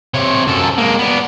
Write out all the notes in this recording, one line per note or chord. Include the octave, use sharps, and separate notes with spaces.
C3 C#5
F#2 A4
G#3 A#3
B3 D4